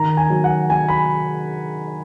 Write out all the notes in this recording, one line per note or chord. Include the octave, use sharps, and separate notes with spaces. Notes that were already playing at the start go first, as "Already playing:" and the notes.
Already playing: D#3 A#5
G#5
F#3
F#5
F#3 G#5
B5